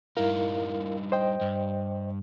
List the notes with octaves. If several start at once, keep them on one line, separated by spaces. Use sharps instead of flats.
G2 D#4 E4 A#4 F5
C5 D#5 G5
G2